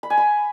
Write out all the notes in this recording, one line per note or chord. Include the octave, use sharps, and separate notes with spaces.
B5
G#5
B5